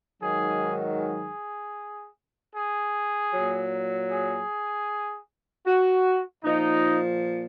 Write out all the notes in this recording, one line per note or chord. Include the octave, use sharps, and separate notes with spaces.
G#2 D#3 F#3 G#4
G#4
G#4
A#2 F#3
G#4
F#4
A#2 F3 D#4